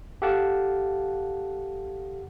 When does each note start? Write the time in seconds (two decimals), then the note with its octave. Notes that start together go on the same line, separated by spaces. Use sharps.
0.22 G4 A4 F5 F#5 A5 D6